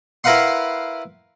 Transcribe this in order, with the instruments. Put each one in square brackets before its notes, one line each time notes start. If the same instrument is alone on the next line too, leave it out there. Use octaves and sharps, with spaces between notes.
[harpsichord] E4 A#4 B4 F5 F#5 C6